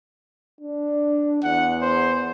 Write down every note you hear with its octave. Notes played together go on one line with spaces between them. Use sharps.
D4
E2 F#5
C5